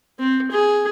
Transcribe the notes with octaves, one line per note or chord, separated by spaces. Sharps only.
C4
G#4